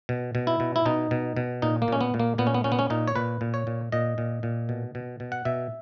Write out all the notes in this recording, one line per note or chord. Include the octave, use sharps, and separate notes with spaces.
B2
B2
E4
B2
E4
B2 D#4
B2
B2
A#2 D#4
A#3
A#2 C#4
B3
A#2
A#3
A#2 B3
C#4
B3
A#2 C#4
B3
C#4
A#2 D#4
C#5
A#2 B4
A#2
C#5
A#2
A#2 D#5
A#2
A#2
B2
B2
B2
F#5
B2 E5